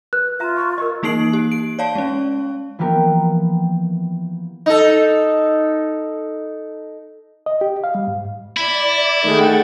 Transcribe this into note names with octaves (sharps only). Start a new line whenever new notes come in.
B4 F#6
F4 E5 A#5
C#6
A#4 D#5 C#6
E3 A#3 D#4 C7 D7 F#7
G4
D7
C#5 D5 F5 A5
G#3 C#4
E3 F3 A#3 B3 G4 A#4
D#4 A4
D#5
G4
F5
G3
G#2
E4 D5
D#3 A3 G#4 F#5 G5 A6